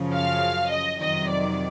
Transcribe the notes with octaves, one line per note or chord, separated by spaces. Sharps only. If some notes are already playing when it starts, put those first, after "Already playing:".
Already playing: F#2 C#3 F3
F5
D#5
F2 C3 D#3 F#3 D#5
D5